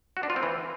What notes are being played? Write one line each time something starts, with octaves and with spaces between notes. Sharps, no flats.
F#4
D4
F4
C4
E3